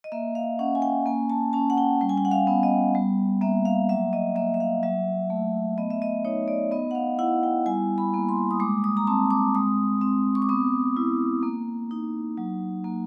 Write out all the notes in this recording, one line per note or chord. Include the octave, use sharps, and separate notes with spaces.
D#5
A#3 E5
F5
C#4 F#5
G#5
G5
A#3 G#5
A5
C#4 A5
F#5
G5
G3 G5
G#5
G5
F#5
F5
B3
D#5
G3
A#3 E5
F5
F#3 E5
D#5
A#3 E5
E5
F5
F#3 E5
A3
B3 D#5
E5
D#5
D#4 C#5
D5
B3 D#5
F#5
F5
E4 F#5
G5
G3 G#5
B5
A#3
C6
D#6
G#3 D6
D#6
A#5
C4 A5
D6
G#3 D#6
C4
C#6
D6
B3 D#6
E4
A#3
D#4
F#3
A#3